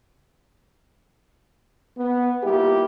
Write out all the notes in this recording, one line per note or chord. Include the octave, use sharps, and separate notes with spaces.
B3
G3 A#3 E4 F4 G4